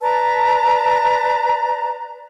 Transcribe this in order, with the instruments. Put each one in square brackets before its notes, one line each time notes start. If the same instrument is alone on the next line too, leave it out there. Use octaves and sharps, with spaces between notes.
[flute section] B4 D5 A5 A#5